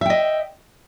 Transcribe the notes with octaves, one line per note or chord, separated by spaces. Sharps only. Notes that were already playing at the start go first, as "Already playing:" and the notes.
D#5 E5 G5